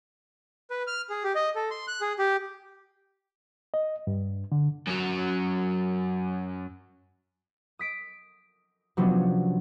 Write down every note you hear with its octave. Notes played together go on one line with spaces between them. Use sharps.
B4
F6
G#4
G4
D#5
A4
C6
F#6
G#4
G4
D#5
G2
D3
F#2 F#3
D#6 B6 D7
C3 F3 F#3 B3 C#4 D4